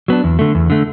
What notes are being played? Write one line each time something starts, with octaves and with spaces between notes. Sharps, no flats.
F#3 B3 D4
E2
D3 A3
E2
D3 A3